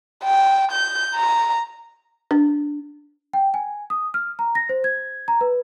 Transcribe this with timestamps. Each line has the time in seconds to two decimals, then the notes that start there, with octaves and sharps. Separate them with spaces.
0.24 G5
0.72 G6
1.15 A#5
2.31 D4
3.33 G5
3.54 G#5
3.90 D#6
4.14 F6
4.39 A#5
4.55 A#6
4.69 C5
4.84 G#6
5.28 A#5
5.41 B4